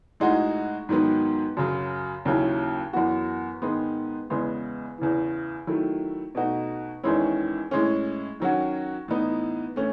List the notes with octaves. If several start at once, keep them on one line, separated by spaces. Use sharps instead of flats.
A2 G#3 D#4 F#4
G#2 D#3 F#3 B3
F#2 C#3 F#3
D#2 C#3 F#3 C#4 E4
F#2 E3 B3 F#4
G#2 D#3 G#3 B3
E2 C#3 G#3 B3
E2 C#3 E3
D#3 F#3 A3 E4
B2 A3 D#4 F#4
E2 D#3 G#3 C#4 E4
A2 G#3 C#4
D#3 F#3 C#4 F#4
A2 E3 B3 D#4
A2 E3 A3 C#4